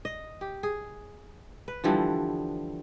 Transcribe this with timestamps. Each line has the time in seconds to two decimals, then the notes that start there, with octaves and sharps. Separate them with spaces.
0.05 D#5
0.41 G4
0.63 G#4
1.68 B4
1.84 D3 E3 F3 G3